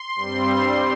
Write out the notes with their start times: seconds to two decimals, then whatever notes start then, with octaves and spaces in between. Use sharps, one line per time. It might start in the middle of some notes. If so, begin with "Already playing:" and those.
Already playing: C6
0.15 G2 G3 C4